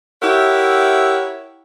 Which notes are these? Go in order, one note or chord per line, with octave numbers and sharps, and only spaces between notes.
E4 G4 A#4 C#5 E5 F#5